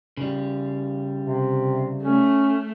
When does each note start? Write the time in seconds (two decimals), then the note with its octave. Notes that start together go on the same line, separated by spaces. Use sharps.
0.17 C#3 G3
1.25 C3
2.03 A3 C#4